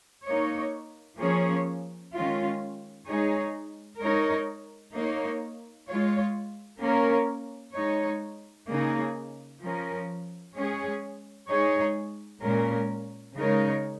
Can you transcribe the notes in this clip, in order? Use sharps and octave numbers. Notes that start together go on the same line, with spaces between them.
A#3 D#4 C#5
F3 A#3 C#4 G#4 C#5
D#3 G#3 C#4 F4
G#3 D#4 G#4 C#5
G#3 D#4 A#4 C#5
A#3 D#4 C#5
G#3 F4 C#5
A#3 C#4 A#4 C#5
G#3 D#4 C#5
C#3 A#3 D#4 G#4
F3 C#4 A#4
G#3 C#4 G#4 C#5
G#3 D#4 G#4 C#5
A#2 G#3 C#4 A#4
C#3 G#3 D#4 A#4 C#5